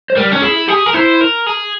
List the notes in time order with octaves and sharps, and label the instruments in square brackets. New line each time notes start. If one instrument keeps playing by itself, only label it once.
[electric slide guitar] C5
[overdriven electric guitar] G3 [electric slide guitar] A#4
[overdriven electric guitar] C#4
[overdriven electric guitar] E4 [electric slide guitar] G#4
[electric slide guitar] G4 [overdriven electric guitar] G#4
[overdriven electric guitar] A#4
[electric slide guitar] E4 [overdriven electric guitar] C5
[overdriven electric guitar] A#4
G#4